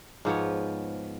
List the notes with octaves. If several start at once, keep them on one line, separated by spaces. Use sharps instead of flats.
G#2 F3 B3 C#5